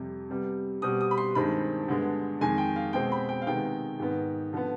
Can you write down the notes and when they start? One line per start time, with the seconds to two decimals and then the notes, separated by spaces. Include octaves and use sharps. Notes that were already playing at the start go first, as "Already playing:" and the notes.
Already playing: F2 C3 G3
0.30 C3 G3 B3
0.82 B2 G3 C4 D#6
1.01 D#6
1.11 B5
1.18 C6
1.35 G2 D#3 G#3 C4 B5
1.88 G2 D3 G#3 B3
2.41 F2 D#3 G#3 G#5
2.58 G5
2.76 F5
2.93 B2 G#3 C4 G5
3.12 B5
3.29 G5
3.42 F5
3.46 C3 D#3 G#3 B3 G5
3.99 G#2 D#3 B3
4.53 D3 F3 B3